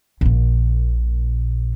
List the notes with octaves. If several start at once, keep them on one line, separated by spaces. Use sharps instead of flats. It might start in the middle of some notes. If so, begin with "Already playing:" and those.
A#1 A#2